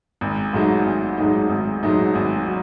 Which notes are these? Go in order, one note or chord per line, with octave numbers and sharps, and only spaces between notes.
G#1
G#2 F#3 A3 D#4
G#1
G#2 F#3 A3 D#4
G#1
G#2 F#3 A3 D#4
G#1
F#3